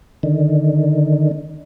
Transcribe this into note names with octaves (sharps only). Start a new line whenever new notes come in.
D3 D#3